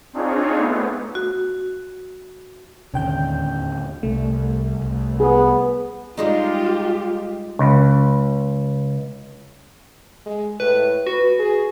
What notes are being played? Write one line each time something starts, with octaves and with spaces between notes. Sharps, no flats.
C4 D4 D#4 F4 G#4 C#5
A3 B3
F#4
D#2 A2 D3 C#4 G5 G6
C2 A3
C2
B3 G#4
G3 G#3 D#4 F4 G4
C#2
G#3
A2 B4
F#4 B4
G#4